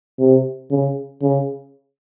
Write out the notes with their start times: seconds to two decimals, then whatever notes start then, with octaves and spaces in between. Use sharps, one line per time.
0.19 C3
0.71 C#3
1.22 C#3